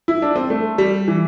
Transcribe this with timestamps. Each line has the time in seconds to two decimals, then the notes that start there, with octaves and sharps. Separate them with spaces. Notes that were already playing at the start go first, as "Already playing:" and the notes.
0.08 E4
0.22 D4
0.36 C4
0.50 A3
0.78 G3
1.08 E3